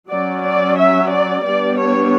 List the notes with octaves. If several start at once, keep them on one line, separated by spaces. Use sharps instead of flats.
F#3 C#4 D5
D5
E5
D5
G3 B3 D4 D5
C#5